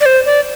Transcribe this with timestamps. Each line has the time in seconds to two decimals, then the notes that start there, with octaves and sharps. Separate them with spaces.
0.01 D5
0.06 C5
0.26 D5